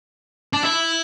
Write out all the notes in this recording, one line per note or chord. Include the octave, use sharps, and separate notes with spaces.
D4
E4